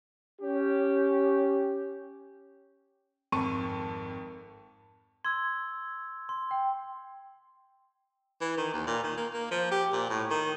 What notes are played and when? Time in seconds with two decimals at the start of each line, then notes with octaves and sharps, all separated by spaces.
0.41 C#4 G4
3.32 G#1 F2 A5 C#6 D#7
5.25 C6 E6 G#6
6.29 C6
6.51 G5
8.41 E3
8.57 D#3
8.74 D#2
8.87 A#2
9.04 D#3
9.17 A#3
9.33 A#3
9.51 F3
9.71 G4
9.93 A#2
10.09 A2
10.31 D#3